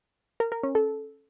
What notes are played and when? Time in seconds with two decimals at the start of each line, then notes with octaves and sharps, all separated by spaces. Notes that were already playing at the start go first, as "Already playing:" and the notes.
0.40 A#4
0.52 A#4
0.63 C#4
0.75 A4